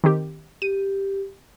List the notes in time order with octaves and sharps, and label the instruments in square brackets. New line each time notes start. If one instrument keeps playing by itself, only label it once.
[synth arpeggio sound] D#3 C4 G4
[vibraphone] G4 [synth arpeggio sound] D#7